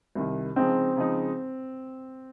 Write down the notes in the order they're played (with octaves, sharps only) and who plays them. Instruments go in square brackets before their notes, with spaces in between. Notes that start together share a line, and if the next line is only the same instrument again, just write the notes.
[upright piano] C2 C3 D#3
[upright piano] C#3 F3 G#3 D#4 [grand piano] C4
[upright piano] C#3 F3 G#3 D#4